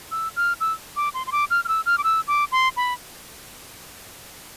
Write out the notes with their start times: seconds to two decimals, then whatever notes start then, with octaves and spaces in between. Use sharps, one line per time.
0.11 E6
0.36 F6
0.60 E6
0.96 D6
1.14 C6
1.27 C6
1.32 D6
1.50 F6
1.65 F6
1.68 E6
1.86 F6
1.98 D6
2.04 E6
2.28 D6
2.52 C6
2.77 B5